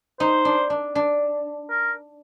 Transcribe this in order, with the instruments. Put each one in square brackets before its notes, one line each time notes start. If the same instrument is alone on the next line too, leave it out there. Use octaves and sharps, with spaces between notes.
[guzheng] D#4 [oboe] C5
[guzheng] D4
D4
D4
[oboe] A#4